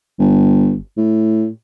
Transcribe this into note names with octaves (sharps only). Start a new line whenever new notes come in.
G1
A2